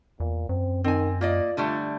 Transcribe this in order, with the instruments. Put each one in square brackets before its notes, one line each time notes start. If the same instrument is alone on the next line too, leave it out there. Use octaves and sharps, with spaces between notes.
[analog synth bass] E2 [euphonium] A#2
[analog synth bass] F#2 [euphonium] C4
[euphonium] D#3 [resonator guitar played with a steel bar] C4 G#5
[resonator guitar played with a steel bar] A#3 D5 D#5 [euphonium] F4
[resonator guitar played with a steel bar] D3 G3 A3